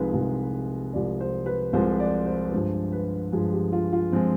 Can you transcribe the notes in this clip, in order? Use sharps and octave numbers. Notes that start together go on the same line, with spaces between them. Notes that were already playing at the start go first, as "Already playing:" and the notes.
Already playing: C2 C3 F3 G#3 D#4 F4 G#4 B4
C2 C3 F3 G#3
C2 C3 F3 G#3 D5
C5
B4
C2 C3 F3 G#3 C5
D5
C5
B4
G2 F3 G#3 C5
B4
G2 F3 G#3 G#4
G4
F4
F4
F3 G#3 C4